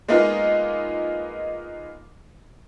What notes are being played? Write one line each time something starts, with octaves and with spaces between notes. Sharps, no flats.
G#3 A#3 B3 D#4 F4